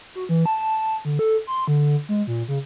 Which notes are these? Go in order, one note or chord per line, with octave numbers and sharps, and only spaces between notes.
F#4
E3
A5
D3
A4
C6
D3
G#3
A#2
C#3